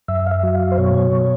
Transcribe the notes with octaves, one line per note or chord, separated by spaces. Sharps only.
F#2 E5
F5
E5
F#3
F5
C5
B2 C#5
B2